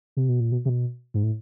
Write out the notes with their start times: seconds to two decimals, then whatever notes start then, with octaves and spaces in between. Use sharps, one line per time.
0.17 C3
0.29 B2
0.40 A#2
0.52 B2
0.65 C3
0.69 B2
1.14 G#2
1.23 A2